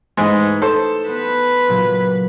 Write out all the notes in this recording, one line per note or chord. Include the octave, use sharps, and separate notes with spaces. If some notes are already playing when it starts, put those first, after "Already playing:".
G#2 E3 G#3 A3 D#4
A4 C5
B3 B4
A#2 C#3 F#3